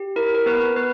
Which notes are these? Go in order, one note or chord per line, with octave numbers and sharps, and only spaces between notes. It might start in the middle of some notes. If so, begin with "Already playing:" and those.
Already playing: G4
E4 A#4
A#4
B3 B4
B3 B4